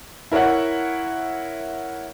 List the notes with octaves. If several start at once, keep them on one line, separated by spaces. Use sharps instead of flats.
E4 A#4 C#5 E5 F#5